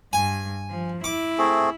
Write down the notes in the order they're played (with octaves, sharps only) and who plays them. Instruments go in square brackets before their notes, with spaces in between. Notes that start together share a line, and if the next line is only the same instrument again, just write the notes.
[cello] G2 [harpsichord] G#5
[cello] F3
[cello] E4 [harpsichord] D6
[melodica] A3 C4 G#4